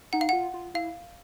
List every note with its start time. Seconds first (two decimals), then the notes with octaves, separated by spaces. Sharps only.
0.13 D#4 F#5
0.21 F5
0.29 F4 F#5
0.54 F4
0.74 E4 F5